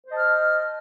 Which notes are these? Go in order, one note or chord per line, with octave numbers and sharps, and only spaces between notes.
C5 D#5 A5 F6